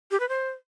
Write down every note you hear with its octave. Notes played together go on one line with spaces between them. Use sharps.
G4
B4
C5